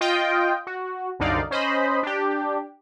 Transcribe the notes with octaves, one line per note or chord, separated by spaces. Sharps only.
F4 D#5 G5
F#4
C2 F#2 D3 D#4 D5 F5
C#4 C5 D#5 B5
D4 G4